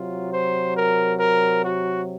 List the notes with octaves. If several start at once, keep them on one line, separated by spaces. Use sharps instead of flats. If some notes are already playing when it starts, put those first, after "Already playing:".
Already playing: C3 F#3 F4
C5
A#4
A#4
F#4